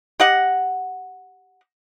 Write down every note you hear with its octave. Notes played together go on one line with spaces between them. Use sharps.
G4 D#5 F#5